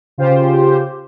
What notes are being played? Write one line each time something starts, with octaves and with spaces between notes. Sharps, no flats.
C#3 F4 G4 C5